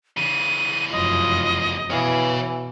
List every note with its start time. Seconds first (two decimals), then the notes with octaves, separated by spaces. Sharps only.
0.17 C#3 E3 D#7
0.92 F1 F#2 F4 D#5
1.90 B2 E3 C#5 F5